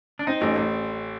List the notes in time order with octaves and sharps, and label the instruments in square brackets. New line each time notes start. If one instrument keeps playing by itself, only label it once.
[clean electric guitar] D4
[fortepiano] C4 [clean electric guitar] D#4
[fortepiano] A1
A1